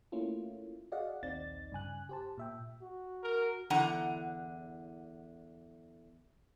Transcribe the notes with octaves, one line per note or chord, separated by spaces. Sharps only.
A3 A#3 C#4 E4 F4
F#4 G#4 D5 D#5 F5 F#5
A#1 D#2 C4 D#4 D5 A6
G2 C#3 G#5 F#6
G4 C5 A5
A#2 E5 G5
F#4
A#4
E2 D3 F#5 A#5